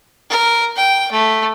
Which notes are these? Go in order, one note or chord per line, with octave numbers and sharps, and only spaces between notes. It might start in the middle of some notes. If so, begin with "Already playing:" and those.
A#4
G5
A3